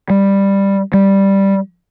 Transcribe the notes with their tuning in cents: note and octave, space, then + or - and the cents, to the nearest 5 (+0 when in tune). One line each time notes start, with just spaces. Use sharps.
G3 +10
G3 +0